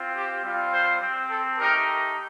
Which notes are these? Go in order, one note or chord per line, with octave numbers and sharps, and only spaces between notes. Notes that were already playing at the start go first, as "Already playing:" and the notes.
Already playing: C4 F4
G4
G3 C4 F4
C5
C4 G4
A4
A3 D#4 G4 A#4